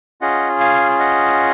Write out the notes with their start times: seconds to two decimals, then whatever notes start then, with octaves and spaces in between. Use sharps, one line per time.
0.21 C#4 F4 G#4 D#5 F#5
0.60 F5 G#5
0.99 D#5 F#5